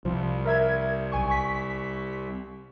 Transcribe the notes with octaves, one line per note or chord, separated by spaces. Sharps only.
C2 F3
A#4 E5 G#6
B1 G#5 C#6
C#6 B6